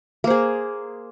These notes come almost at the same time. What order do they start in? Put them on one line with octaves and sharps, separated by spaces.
A#3 C5 G#4